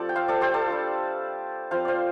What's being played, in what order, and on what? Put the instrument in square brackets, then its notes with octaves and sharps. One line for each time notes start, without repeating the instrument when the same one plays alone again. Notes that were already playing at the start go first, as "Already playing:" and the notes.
Already playing: [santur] F3 A3 C4 F4 G4 A4 D5
G5
C5 F5
A4 D5
G4 C5
A4 D5
G3 D4 F4
F3 C4 F4 C5 F5
C5 D5 F5